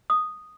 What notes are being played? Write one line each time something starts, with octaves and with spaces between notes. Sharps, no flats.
D#6